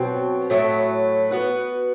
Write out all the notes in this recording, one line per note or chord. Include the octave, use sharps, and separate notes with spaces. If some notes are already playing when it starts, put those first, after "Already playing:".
Already playing: B2 F#3 C4
A2 F#3 A3
B3 F#4 B4